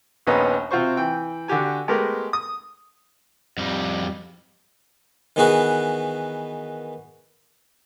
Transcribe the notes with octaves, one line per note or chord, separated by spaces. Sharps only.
A#1 D#2 B3 C#4 D#4 B4
C3 C4 F4 F#4 C5 C#6
E3 G5
D3 F#4 G4 G#5
G#3 A3 B3 G4 A#4
D#6
F2 G3
D#3 E3 B3 F#4 G#4 B4